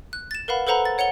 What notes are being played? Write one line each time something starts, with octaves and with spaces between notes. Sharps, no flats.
F#6
A6 E7
A#4 B4 F5 F#5 B5
A4 B4 C5 F#5 A#5 B5
A6
C#5 F#5 C#7 F7 G7